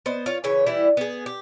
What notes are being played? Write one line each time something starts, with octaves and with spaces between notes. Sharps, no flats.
B3 C5 D#5
F4 C#5
C#3 E3 C#5
E3 G3 E4
B3 G#4
G4